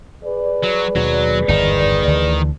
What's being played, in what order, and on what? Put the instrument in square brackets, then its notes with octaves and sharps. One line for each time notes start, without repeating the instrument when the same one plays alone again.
[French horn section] G#4 B4 D5
[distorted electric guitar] F#3
[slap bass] D#2 B2 [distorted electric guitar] F#3
[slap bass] G1 E2 G#2 [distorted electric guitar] D#3 D#4
[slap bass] D2 D3 E3